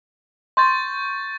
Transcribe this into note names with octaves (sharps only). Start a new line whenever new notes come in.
C6 C#6 G6 A6